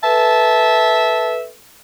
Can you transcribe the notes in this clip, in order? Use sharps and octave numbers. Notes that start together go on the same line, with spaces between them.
A4 B4 E5 A5